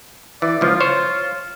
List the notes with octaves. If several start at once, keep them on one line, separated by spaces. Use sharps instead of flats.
E3 D5
C#2 F3 F4
C5 C#5